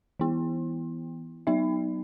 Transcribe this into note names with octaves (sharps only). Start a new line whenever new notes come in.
E3 B3 E4
F#3 B3 D#4 E5